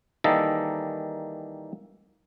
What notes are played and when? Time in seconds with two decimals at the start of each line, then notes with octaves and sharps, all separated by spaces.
0.24 D#3 E3 G3 A#3 A4 D#5